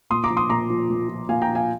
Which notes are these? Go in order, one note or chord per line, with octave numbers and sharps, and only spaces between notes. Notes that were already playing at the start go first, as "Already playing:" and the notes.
A#2 C6 D#6
A#5 D6
F3
C6 D#6
A#2 A#5 D6
F3
A#2
F3
A#2 F5 G#5
G5 A#5
F3
F5 G#5